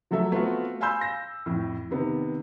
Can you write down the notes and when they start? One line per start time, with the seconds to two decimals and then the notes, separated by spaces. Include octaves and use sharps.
0.11 F3 F#3 A3 A4 E5
0.32 A3 B3 C4 F4 F#4
0.81 F5 G#5 B5 C6 E6 G6
1.01 A#6
1.46 F2 A2
1.91 C3 D#3 B3